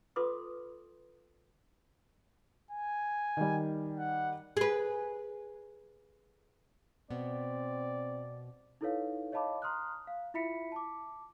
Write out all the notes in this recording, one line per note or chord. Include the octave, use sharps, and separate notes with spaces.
F4 A4 B4 C6 D6 D#6
G#5
D#3 G3
F#5
G#4 B4
B2 B3 C4 D5
D#4 E4 A4 B4 C#5 F5
C#5 D#5 F5 A5 B5 D6
A#5 C6 D#6 F6 F#6
F5
E4 F4 E5 B5 B6 C#7
A5 D6